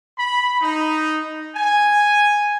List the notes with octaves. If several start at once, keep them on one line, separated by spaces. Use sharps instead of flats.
B5
D#4
G#5